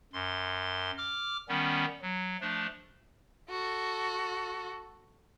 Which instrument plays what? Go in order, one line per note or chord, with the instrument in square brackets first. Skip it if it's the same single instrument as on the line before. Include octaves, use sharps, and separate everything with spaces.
[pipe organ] F#2 C6
D6 F6
D#3 G3 B3 C#4
F#3
F3 A3 D4
[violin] F#4 A4